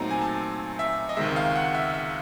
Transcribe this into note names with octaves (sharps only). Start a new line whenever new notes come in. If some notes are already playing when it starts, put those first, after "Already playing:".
Already playing: A#2 F#3 A3 C4 D#4 A#5
G#5
A5
E5
D#5
C#2 C3 D#3 G#3 E5
F5
F#5
E5
E5